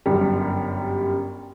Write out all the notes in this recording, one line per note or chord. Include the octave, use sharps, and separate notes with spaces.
G1 F#2 G3